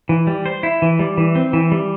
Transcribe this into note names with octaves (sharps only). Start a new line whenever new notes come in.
E3
G3
C5
E4
E3
G3
E3
C4
E3
G3